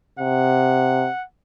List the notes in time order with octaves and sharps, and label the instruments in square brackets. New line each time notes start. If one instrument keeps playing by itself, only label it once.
[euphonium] C3 [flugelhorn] F#5